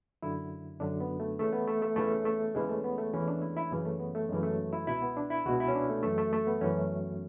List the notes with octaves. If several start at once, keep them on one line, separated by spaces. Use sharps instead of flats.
F#2 D3 E4
F#2 D3 D4
B3
A3
E2 C#3 E3 A3
B3
A3
A3
E2 C#3 E3 A3
A3
E2 C#3 E3 G#3
A3
B3
A3
E2 C#3 E3 C#4
D4
E4
E4
F#2 C#3 E3
A3
B3
A3
F#2 C#3 E3 G#3
A3
E4
C#2 B2 E4
B3
D4
E4
C#2 B2 F#4
E4
C#4
D4
A3
F#2 E3 A3
A3
A3
B3
F#2 E3 C#4